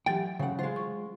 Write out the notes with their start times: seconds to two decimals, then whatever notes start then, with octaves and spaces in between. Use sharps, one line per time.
0.06 E3 F#3 G4 G5
0.39 C#3 F#5
0.59 G#3 F4 C5
0.76 C#6